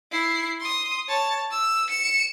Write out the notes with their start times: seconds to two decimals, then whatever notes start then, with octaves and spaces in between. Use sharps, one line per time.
0.11 E4 C7
0.60 C6 D#6
1.08 C#5 A5
1.51 E6
1.90 C#7 E7